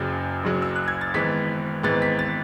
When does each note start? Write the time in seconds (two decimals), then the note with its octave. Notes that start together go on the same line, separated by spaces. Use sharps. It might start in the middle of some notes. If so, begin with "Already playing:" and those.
Already playing: F#1 F#2 C#3 F#3 A6
0.43 F#1 F#2 C#3 F#3
0.62 E6
0.75 F#6
0.88 G#6
1.01 A6
1.14 G#1 G#2 E3 B3 B6
1.83 G#1 G#2 E3 B3 A6
2.02 B6
2.19 A6